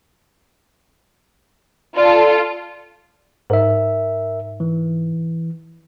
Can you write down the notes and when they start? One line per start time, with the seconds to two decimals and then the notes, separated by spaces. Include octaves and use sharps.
1.97 F4 A4 D5
3.50 G#2 A#4 E5
4.60 E3